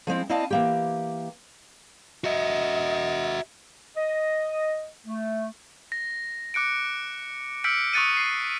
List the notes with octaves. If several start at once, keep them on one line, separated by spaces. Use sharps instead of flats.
F3 G#3 C4 E4
C4 E4 D5 D#5 F5 A5
E3 A#3 G4
F#4 D#5 E5
D#5
A3
A#6
D6 F#6 C#7 D7
E6 F6 G6 B6 C#7 D7
C#6 D#6 F#6 A6 C#7 D#7
C7